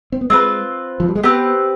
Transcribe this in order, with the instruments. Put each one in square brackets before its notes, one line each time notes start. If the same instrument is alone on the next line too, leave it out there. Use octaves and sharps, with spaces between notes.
[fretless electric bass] C4
B3
[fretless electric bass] G#3 [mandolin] C4 F4 B4
[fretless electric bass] F3
G3
G#3
[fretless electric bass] B3 [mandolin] C4 G4 B4